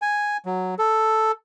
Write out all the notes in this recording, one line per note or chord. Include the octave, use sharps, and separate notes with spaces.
G#5
F#3
A4